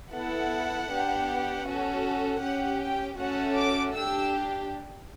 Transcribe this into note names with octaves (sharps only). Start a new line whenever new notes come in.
B3 E4 A4 F#5
B3 D4 G4
C#4 F#4 A4
C#4 G4 F#5
G5
A3 C#4 F#4 A4 F#5
D6
D4 G4 E6